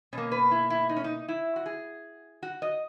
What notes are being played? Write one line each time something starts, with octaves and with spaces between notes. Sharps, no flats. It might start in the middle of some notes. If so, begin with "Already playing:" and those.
B2 A#3 C#4
B4
E4
E4
D#4
C#4
D#4
E4
F#4
G#4
F#4
D#5